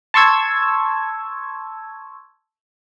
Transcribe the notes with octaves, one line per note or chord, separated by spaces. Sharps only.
A5 C6 C#6 E6 G#6